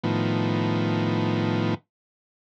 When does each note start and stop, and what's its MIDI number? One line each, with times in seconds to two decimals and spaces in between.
0.04 1.74 45
0.04 1.74 51
0.04 1.74 53
0.04 1.74 59